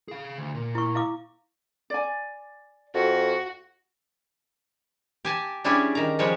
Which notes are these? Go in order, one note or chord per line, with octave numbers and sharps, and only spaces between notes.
G#4 F5
D2
A#2
E4 C#6
E4 F5 D6
D5 G#5
F2 F#4 A4
G4 G#5 A5
G3 C#4 D4 E4 G4 G#4
D#3 A#5
C#3 F3 G3 G#3 G4 C#5